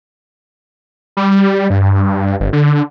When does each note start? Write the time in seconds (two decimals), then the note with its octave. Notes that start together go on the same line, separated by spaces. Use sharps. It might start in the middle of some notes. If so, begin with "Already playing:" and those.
1.17 G3
1.70 G2
2.40 G1
2.53 D3